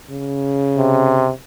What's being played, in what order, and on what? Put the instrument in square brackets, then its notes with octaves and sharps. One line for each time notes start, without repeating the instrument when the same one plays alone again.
[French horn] C#3
[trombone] C3